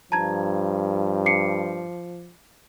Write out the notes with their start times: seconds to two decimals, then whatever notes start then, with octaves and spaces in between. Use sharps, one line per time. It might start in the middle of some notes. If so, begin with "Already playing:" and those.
0.12 G2 F3 A5 A#5 G#6
1.26 D6 C7 C#7